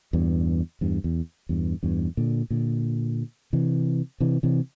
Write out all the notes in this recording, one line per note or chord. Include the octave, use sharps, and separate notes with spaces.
E2 G2
E2 G2
E2
E2 G2
E2 G2
A#2 D3
A#2 D3
C3 E3
C3 E3
C3 E3